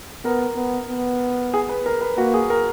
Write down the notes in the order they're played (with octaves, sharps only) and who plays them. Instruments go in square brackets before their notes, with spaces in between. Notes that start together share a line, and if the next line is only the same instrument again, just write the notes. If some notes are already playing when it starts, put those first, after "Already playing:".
[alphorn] B3 [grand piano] A#4
[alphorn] B3
B3
[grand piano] G#4
B4
A#4
B4
[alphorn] A#3 [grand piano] F#4
[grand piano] G#4
A#4